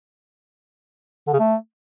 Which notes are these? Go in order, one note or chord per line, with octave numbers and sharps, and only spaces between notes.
D3
C#3
A3